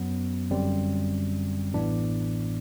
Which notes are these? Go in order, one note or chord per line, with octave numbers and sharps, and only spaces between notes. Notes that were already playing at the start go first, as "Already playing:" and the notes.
Already playing: F#2 F#3 B3
G1 F#2 D3 G3 C4
A1 A2 E3 B3 D4